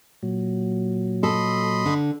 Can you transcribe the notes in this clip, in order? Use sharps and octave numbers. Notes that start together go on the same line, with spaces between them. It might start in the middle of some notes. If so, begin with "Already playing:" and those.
A#2 F#3
A4 D#5 B5 C6
D3